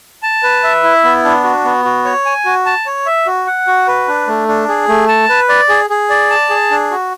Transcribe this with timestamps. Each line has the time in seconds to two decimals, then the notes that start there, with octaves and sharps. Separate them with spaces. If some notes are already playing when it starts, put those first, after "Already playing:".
0.23 A5
0.43 B4
0.64 E5
0.84 E4
1.04 B3
1.24 D4
1.44 F#4
1.64 B3
1.85 F#4
2.05 C#5
2.26 G#5
2.45 F#4
2.66 A5
2.86 C#5
3.06 E5
3.26 F#4
3.47 F#5
3.67 F#4
3.87 B4
4.08 D4
4.28 A3
4.48 D4
4.68 G#4
4.88 A3
5.08 A5
5.29 B4
5.49 D5
5.69 G#4
5.90 G#4
6.10 D5
6.30 A5
6.50 G#4
6.71 D4
6.91 F#4